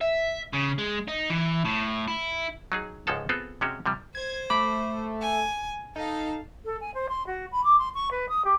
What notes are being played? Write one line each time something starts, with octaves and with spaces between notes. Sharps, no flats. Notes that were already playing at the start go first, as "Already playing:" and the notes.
E5
C#3
G#3
D#4
E3
A2
E4
F#3 D#4 G#4
C#2 G#2 F3 G#3 A4 A5
B3 C4 F4 G#4 A4
C3 G#3 C#4 F#4 G4
C3 F3 G3
C5 G#6
A3 B5 D6 B6
G#5
D#4 A4 F5
A4
G#5
C5
C6
F#4
B5
D6
C6
C#6
B4
D#6
G4